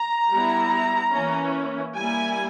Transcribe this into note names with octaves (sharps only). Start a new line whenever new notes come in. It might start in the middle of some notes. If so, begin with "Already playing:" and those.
Already playing: A#5
G3 B3 E4
E3 A#3 C#4
G3 A#3 E4 G#5